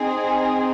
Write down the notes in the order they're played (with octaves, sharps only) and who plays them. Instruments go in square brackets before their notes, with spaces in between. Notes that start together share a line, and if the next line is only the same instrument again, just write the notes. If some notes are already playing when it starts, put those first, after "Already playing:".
Already playing: [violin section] C4 D#4 G#4